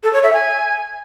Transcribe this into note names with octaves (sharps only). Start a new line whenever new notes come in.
A4
C#5
E5
G#5